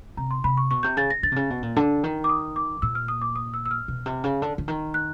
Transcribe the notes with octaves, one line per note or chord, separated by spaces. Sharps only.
C3 A#5
C6
C3 B5
C#6
B2 C#6
C3 G6
C#3 A6
A#6
D3 A6
C3
C#3
B2
A#2
D3
D#3
D6
D#6
D6
A#2 E6
F6
D#6
D6
D#6
E6
E6
F6
B2
C3
C#3
D3
D3
D#3
F#6